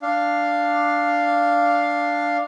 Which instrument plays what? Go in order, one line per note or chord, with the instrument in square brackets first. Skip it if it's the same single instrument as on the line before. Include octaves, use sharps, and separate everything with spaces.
[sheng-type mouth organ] D4 F5